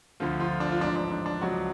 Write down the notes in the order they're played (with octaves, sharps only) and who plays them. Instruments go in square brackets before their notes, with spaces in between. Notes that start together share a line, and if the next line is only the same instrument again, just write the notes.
[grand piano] D2 D3 F3 F4
F3 F4
D4
F4
A1 G#2 F3 D4
D4
D4
D4
C#2 C#3 F3 F#3 F#4